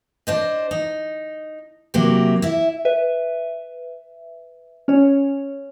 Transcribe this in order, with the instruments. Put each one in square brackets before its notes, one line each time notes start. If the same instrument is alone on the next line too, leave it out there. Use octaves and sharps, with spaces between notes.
[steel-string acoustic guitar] D4 C5 D#5
D#4
C3 F#3 A#3 E4 F#4 G4
E4 E5
[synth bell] B4 E5
C#4 C#5